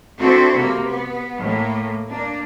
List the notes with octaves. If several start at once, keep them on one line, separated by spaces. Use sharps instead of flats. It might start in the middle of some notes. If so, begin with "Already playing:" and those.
C4 D4 E4 F#4 A4
C3 A#3
B3
A2 A#3
A#3 D4